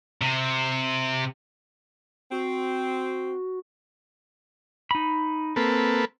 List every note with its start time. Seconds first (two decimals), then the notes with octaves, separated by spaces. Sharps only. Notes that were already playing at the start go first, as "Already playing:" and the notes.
0.22 C3
2.32 C4 F#4
4.91 D#4 B5
5.56 A#3 C4 A4 B4